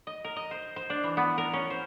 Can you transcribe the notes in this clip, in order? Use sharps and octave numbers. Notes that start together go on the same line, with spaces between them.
D#5
A#4
D#5
C5
C5
D4
E3
B3
A#4
C#4
C5